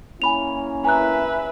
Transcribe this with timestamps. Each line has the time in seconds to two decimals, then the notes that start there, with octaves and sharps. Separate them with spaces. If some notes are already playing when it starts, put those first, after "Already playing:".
0.22 A#3 C#4 E4 G#5 B5 F7
0.85 B4 E5 G#5 A#5 F#6